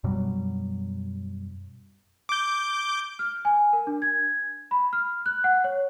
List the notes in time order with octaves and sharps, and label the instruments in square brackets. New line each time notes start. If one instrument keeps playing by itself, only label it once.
[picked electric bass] F#2 B2 F#3 G3
[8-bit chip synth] D6 G6
[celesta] F6
G#5
A#4
D4
G#6
B5
F6
F#6
F#5
C#5